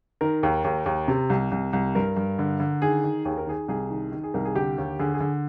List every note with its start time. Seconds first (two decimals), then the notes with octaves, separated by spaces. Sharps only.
0.21 D#3 A#4
0.43 D#2
0.64 D#2
0.86 D#2
1.08 C3
1.30 C2
1.52 C2
1.73 C2
1.95 G2 A#4
2.17 G2
2.39 D3
2.60 D3
2.82 D#3 G#4
3.04 D#3
3.25 D#2 G#4
3.38 A#4
3.47 D#3 G#4
3.68 C2 G#4
3.90 D#3
4.12 D#3
4.23 G#4
4.34 C2 A#4
4.45 G#4
4.55 D3 G4
4.78 D#2
4.99 D3 G#4
5.14 G#4
5.21 D3